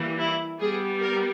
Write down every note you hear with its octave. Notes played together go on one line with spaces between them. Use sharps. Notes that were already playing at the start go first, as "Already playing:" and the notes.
Already playing: E3 G3 A#3
E4
G3 B3 G#4
A#4